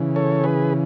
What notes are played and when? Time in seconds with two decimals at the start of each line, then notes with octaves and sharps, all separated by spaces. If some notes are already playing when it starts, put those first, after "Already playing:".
Already playing: C#3 E3
0.16 A4 C#5
0.44 G#4 B4